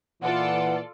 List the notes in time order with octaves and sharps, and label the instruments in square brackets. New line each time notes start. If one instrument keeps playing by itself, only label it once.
[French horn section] A#2 E3 [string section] F4 A4 D5 [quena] F#5